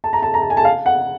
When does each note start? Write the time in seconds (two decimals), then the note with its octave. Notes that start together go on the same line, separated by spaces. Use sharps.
0.04 A5
0.13 A#5
0.22 A5
0.34 A#5
0.42 A5
0.50 G#5
0.57 A5
0.65 F5
0.86 F#5